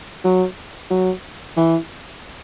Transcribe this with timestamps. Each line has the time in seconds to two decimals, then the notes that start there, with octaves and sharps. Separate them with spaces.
0.24 F#3
0.91 F#3
1.57 E3